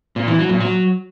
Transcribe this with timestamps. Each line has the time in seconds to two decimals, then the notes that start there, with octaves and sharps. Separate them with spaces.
0.16 A#2
0.27 E3
0.38 F#3
0.49 A#2
0.60 F#3